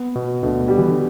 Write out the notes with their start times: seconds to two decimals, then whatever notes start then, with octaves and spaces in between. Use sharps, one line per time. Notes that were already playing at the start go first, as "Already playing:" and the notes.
Already playing: B3
0.15 B2
0.43 D2 B2 D3
0.68 G3 G4
0.78 E3
0.89 D3